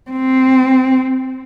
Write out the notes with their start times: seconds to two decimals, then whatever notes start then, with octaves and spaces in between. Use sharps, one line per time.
0.11 C4